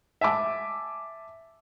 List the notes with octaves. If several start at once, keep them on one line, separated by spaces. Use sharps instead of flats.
E5 G#5 A5 D6